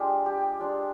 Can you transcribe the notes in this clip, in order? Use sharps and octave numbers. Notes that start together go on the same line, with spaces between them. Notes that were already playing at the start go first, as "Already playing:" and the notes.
Already playing: G#3 D4 F4 G4
G4
G#3 D4 F4